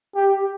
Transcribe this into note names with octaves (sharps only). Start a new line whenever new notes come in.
G4